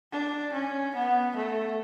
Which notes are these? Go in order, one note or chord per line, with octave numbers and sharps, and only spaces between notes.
D4
C#4
B3
A3